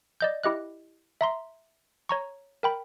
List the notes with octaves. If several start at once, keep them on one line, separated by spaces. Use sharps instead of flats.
D5 D#5 G6
E4 G4 D#5 F#6
E5 A#5 C6
C#5 A#5 C#6
A#4 G5 B5